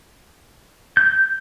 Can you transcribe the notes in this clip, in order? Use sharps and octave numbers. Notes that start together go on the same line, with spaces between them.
G6